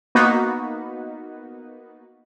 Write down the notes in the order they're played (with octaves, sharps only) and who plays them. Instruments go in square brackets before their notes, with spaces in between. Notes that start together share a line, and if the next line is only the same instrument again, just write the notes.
[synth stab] A#3 B3 D#4 F#4 B4